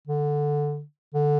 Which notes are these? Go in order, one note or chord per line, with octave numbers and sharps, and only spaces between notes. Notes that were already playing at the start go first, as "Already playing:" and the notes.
D3
D3